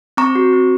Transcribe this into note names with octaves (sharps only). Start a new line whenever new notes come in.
C4 A#5 C#6
F#4
C4